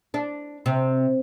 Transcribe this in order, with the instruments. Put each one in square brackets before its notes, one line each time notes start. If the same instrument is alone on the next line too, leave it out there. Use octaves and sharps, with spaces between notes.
[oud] D4
C3